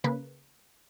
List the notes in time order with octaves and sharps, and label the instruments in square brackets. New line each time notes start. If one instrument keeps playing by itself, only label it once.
[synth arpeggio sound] C#3 A#3 B4